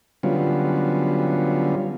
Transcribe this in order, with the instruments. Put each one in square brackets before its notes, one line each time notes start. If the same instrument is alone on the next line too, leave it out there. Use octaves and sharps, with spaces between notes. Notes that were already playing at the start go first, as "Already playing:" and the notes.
[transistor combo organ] D3 F#3 G3 B3 C#4 F4